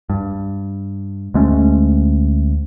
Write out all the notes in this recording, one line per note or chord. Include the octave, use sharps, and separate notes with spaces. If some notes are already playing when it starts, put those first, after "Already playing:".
G2
D2 G#3 A3 C#4